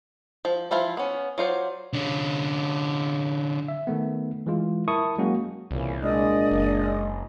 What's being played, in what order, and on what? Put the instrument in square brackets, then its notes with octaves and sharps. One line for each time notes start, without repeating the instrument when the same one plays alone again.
[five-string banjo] F3
E3 F3 E4 F4
B3 C#4
F#3 F4 C5 D5
[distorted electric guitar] D3 C#4
[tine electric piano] E5
D#3 A3 B3
E3 G#3 F4
E4 A#4 A5 C#6 D#6
F#3 G#3 A#3 C#4 F#4
[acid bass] C2 [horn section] A#2 C#3 E3
[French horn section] A#2 D4 [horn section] G#3 [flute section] D5 D#5 D#6
[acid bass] F#1